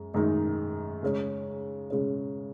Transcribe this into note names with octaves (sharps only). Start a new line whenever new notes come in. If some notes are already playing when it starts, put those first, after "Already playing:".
Already playing: F#2 G#3
F#2 D#3 G#3 D#4
C#3 G#3 C#4
C#3 G#3 C#4